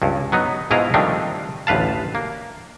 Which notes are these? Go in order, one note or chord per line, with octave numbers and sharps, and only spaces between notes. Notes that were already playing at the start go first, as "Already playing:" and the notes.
C#2 G2
F#3 B3 D#4
G#2 B2 E4 F4 G#4 A#5
D#3 F3 G3 A3 C4 D4
A1 D2 B4 F5 A5
A#3